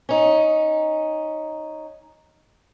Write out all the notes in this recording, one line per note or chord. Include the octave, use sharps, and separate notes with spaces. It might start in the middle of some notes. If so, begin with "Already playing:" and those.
C#4 D#4